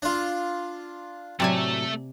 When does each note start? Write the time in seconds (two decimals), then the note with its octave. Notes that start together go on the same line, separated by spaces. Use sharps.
0.02 D4 F4
1.40 A2 C3 F#3 A3 A4 D5 G#5